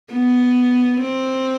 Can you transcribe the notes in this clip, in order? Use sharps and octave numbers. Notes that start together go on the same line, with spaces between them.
B3
C4